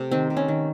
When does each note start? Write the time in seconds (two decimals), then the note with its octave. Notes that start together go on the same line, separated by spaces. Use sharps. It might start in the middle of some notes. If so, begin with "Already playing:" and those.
Already playing: C3 A3
0.11 D#3 C4
0.30 C3
0.37 C#4
0.48 D#3